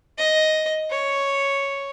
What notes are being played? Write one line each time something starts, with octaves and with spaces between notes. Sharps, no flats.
D#5
C#5